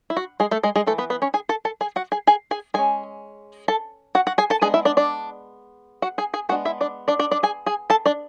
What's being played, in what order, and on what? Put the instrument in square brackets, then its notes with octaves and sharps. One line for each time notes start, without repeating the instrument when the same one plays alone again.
[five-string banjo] E4
F#4
G#3 G#4
A3 A4
G#3 G#4
G#3 G#4
E3 A3 A4
B3 B4
B3 B4
C#4 C#5
G#4 G#5
A4 A5
A4 A5
G#4 G#5
F#4 F#5
G#4 G#5
G#4 G#5
G#4 G#5
G#3 C#4 G#4 G#5
A4 A5
F#4 F#5
F#4 F#5
G#4 G#5
A4 A5
G#3 B3 D4 G#4 G#5
E4 E5
D4 D5
D4 D5
F#4 F#5
G#4 G#5
G#4 G#5
G#3 B3 D4 F#4 F#5
E4 E5
D4 D5
D4 D5
D4 D5
D4 D5
G#4 G#5
G#4 G#5
A4 A5
D4 D5